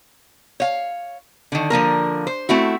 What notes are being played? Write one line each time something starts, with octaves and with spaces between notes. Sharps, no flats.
C#5 F5
D3 D#3
D3 F3 A#3 A#4
C5
A3 C4 E4 F#4